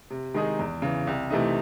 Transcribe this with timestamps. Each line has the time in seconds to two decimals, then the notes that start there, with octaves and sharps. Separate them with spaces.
0.10 C3
0.34 D#3 G#3 D#4 G#4
0.59 E2
0.82 C#3 E3
1.07 C2
1.30 C3 E3 A3 D#4